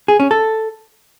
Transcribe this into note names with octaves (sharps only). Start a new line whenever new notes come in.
G#4
C#4
A4